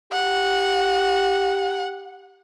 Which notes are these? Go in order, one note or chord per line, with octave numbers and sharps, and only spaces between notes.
G4 F#5